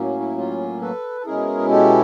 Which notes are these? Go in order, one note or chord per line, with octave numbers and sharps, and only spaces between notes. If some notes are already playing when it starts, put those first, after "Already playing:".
Already playing: A2 F#3 A#3 C#4
E4
F4
A4 B4
A4
B2 G#3 C#4 E4 G#4 A#4
G4 A4